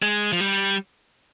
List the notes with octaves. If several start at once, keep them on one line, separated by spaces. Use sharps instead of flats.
G#3
F3
G3